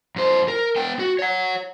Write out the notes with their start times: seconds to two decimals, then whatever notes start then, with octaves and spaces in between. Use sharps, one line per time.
0.16 F#2 C5
0.48 A#4
0.76 B3 G5
0.99 F#4
1.19 C#5 F#5